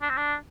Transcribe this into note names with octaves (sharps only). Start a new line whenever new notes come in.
D4
C4
D4